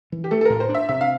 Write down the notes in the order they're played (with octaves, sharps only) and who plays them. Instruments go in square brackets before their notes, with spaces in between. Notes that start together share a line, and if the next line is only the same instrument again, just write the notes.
[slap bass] E3
[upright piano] G4
[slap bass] A3 [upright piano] A4
[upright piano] A4
[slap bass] A2 [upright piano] A#4
[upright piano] C5
[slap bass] D4
[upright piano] E5
[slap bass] C3 [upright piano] E5
[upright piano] F5